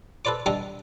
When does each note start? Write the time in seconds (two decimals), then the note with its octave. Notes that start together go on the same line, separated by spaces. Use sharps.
0.25 A4 B4 C5 D5 D6
0.46 D3 G3 A4 D#5 G#5 D6